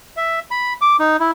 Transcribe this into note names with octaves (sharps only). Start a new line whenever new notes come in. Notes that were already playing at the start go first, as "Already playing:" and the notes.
E5
B5
D6
D#4
E4